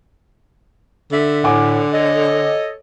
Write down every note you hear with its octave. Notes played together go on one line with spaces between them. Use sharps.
D3 E5
A2 F#5 G#5 D6
A4 C#5 D#5